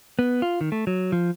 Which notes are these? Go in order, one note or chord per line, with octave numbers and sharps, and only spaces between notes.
B3
F4
D#3
A3
F#3
F3